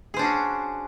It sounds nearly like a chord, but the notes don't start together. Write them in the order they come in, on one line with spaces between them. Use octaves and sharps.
G#4 C5 D4 F#4 C#4